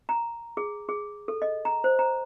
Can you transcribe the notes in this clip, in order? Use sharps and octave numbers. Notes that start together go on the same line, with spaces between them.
A#5
G#4
G#4
A4
D#5
A#5
C5
A#5